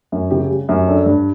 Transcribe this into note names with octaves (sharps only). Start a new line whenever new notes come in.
F#2
C#3 G4
G3
F#2
D4 A4
G2